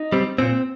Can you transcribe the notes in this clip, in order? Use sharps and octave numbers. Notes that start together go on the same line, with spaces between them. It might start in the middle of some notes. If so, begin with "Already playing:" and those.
Already playing: D#4
G3 C4
A#2 C4